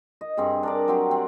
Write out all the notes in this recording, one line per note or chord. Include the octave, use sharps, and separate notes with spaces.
D#5
G2 C4 G#4
D4 A#4 D5
F#3 C4 G4
C4